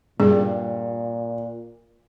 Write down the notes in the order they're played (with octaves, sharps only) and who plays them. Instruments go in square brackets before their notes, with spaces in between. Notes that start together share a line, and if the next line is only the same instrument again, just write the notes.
[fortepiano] G2 [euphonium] A#2 [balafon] G#4